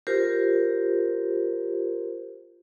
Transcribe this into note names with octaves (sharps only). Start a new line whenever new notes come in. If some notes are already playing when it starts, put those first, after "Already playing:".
F4 G4 A#4 C5